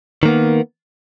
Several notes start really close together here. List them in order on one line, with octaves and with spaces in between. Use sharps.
D#3 A#3 B3